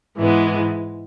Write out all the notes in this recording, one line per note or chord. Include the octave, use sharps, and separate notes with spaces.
G#2 E3 G#3 B3